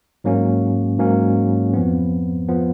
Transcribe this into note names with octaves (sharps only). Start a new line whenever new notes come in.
G#2 F#3 A#3 C#4
G#2 F#3 A#3 C#4
F2 F3 B3
F3 B3